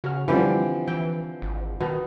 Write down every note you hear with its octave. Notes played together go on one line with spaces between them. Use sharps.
C#3 F#4 F6
D3 E3 F3 G3 C4 G4 D5
E3 G5
G#1
B2 D#3